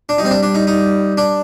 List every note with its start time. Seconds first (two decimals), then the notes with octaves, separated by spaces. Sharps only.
0.09 D4
0.18 G3 D#4
0.25 C4
0.31 D4
0.43 D4
0.55 D#4
0.67 D#4
1.17 D4